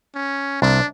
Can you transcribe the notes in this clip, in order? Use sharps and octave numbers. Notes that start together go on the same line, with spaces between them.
C#4
C2 D4